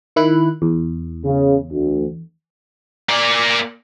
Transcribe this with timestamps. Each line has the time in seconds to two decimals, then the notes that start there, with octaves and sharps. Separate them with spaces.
0.16 D#3 E4 F#6
0.62 E2
1.25 C#3
1.72 D2
3.09 A#3 D5